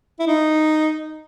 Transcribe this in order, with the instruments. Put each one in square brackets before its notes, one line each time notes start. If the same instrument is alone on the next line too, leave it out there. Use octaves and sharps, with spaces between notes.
[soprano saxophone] E4
D#4